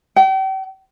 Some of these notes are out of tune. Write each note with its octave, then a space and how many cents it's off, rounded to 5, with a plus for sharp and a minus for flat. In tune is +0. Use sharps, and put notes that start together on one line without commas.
G5 -40